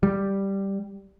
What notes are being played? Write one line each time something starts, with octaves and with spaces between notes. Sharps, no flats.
G3